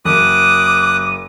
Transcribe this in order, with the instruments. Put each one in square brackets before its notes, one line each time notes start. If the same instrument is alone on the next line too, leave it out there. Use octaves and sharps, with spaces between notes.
[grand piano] F#1 [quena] D6 [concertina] D#6 F#6 [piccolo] D#7